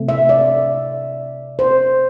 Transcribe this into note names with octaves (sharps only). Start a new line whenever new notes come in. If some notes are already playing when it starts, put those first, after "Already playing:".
Already playing: C3 A3
E5
D5
C5